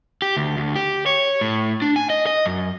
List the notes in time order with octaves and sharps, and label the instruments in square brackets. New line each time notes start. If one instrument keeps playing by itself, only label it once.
[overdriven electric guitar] G4
D2
D2
G4
C#5
A2
D4
G#5
D#5
D#5
F#2